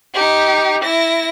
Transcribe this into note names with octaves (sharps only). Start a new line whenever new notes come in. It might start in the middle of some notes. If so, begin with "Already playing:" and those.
D#4 G4
E4 A#6